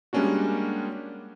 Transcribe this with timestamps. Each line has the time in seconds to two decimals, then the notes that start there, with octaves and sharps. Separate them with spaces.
0.13 G3 G#3 A#3 C#4 D4 F#4